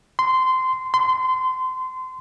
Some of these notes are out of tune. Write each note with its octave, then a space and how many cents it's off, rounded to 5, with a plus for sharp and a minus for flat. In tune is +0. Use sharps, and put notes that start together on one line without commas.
C6 -15
C6 -25